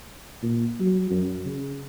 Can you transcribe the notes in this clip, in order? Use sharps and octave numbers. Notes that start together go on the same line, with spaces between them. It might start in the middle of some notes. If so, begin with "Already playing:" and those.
A#2
F#3
F#2
C#3